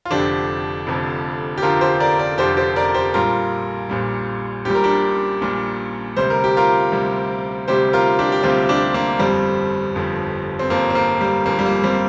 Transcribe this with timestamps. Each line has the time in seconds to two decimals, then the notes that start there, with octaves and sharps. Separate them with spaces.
0.05 F4
0.11 F1 F2 D3 F3 D4 G4
0.87 F1 F2 D3 F3
1.57 G4
1.62 F1 F2 D3 F3 F4 A#4
1.81 G4 C5
2.00 A#4 D5
2.19 A#4 D5
2.38 F1 F2 D3 F3 G4 C5
2.57 G4 C5
2.76 A#4 D5
2.94 G4 C5
3.14 A#1 A#2 G3 F4 A#4
3.89 A#1 A#2 G3
4.65 A#1 A#2 G3 G4
4.75 A#4
4.84 D4 G4
5.41 A#1 A#2 G3
6.16 D2 C3 G3 C5
6.30 A#4
6.44 G4
6.57 F4 A#4
6.92 D2 C3 G3
7.68 D2 C3 G3 G4 C5
7.93 F4 A#4
8.19 D4 G4
8.32 G4
8.43 D2 C3 G3 C4 F4
8.69 D4 G4
8.94 A#3 D4
9.19 G1 F2 F3 G3 C4
9.95 G1 F2 F3
10.59 C4
10.70 G1 F2 F3 A#3
10.90 C4
10.95 A#3
11.21 G3
11.46 G1 F2 F3 A#3
11.59 G3
11.66 A#3
11.84 G3 C4